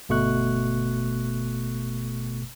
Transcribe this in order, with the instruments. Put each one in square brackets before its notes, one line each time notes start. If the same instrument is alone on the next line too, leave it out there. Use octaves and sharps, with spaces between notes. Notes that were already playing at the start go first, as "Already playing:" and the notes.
[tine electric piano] G1 B2 A3 C#6 F#6